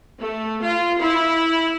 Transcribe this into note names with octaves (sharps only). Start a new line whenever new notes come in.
A3
F4
E4